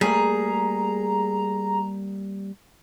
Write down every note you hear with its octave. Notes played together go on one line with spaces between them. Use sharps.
G3 A3 A#3 G#4 A#5